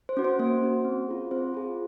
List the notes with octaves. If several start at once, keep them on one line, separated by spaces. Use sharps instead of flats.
C5
C#4 F#4
C5
A#3 C5
C#4 F#4
C4
F4 G#4
C4 C5
F4 G#4